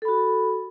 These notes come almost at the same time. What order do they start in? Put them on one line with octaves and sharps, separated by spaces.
A4 B5 F#4